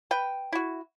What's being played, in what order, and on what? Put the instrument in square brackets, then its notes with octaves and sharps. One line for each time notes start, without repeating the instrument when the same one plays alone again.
[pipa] B4 G5
E4 F#4